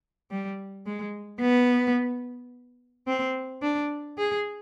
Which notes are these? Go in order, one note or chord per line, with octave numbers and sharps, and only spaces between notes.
G3
G#3
B3
C4
D4
G#4